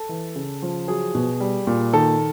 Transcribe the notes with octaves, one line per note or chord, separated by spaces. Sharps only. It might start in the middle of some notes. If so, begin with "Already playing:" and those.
Already playing: A4
E3
C#3
F3
F#3 G#4
B2
G3
A#2
D#3 A4